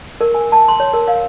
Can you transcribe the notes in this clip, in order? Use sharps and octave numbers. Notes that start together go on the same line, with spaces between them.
A#4
G#5
A5
C6
C#5
A#4
F5